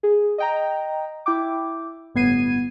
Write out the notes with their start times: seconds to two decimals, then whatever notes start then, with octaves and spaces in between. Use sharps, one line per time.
0.03 G#4
0.38 D#5 G5 A#5
1.26 E4 G5 D6
2.15 G1 A2 B3 G#6 C7 D#7